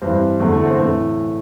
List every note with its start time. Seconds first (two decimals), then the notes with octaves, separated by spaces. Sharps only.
0.02 G2 E3 C4
0.40 E2 D3 A3
0.52 A3
0.66 C4
0.78 A2 E3 A3